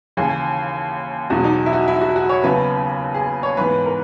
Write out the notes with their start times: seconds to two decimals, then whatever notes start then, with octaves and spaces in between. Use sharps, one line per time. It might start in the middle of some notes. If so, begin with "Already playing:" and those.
0.17 D#2 C#3 E3 G#4
1.30 E2 B2 F#3 F#4
1.44 D#4
1.66 E4
1.73 F#4
1.88 E4
2.01 F#4
2.16 F#4
2.29 C#5
2.44 D#2 C#3 F#3 B3 B4
3.14 G#4
3.43 C#5
3.57 G#2 E3 B3 B4
3.85 A#4